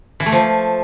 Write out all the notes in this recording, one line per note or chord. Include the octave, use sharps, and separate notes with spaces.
E3
A3
F3